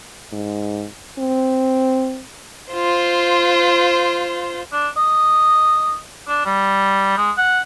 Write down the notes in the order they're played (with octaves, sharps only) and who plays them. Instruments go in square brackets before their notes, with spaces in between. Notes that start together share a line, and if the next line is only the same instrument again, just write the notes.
[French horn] G#2
C4
[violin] F4 C5
[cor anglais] D4
D#5
D4
G3
G#3
F#5